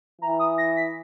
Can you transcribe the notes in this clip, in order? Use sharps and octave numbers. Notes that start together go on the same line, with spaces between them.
E3 A#5
D#6
A#6
B6